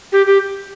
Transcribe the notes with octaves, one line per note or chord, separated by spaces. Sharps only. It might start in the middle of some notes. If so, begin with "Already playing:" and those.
G4
G4